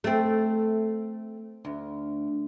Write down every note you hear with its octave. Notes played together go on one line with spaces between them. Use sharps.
A3 C4
D2